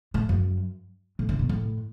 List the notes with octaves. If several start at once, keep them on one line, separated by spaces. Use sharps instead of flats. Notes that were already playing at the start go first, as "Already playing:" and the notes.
A2
F#2
A2
D3
B2
A2